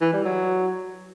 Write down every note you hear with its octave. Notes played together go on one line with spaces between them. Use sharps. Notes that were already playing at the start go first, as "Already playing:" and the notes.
E3
G3
F#3